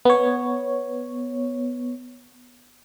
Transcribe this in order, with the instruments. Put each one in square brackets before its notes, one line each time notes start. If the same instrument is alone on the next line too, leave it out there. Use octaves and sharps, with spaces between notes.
[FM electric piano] B3 C#5